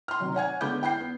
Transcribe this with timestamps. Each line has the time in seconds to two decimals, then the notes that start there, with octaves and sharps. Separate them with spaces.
0.08 C6 F6
0.20 C3 D#3 F#3
0.35 C#5 F#5 G#5 G#6
0.61 D3 G#3 B3 B5 D6 G6
0.82 E4 G5 B5 G6 C7
1.00 B3